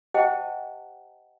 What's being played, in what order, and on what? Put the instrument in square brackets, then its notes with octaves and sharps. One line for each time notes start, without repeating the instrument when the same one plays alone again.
[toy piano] G4 C5 D#5 F#5 G5 A5